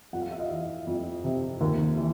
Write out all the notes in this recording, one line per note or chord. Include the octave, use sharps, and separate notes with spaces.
F2 F#5
F5
E5
D#5 F5
E3
F2
C3
D#2
E3